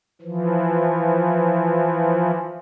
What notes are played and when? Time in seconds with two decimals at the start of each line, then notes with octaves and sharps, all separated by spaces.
0.22 E3 F3